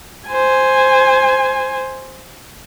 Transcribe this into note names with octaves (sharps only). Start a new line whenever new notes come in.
C5 G#5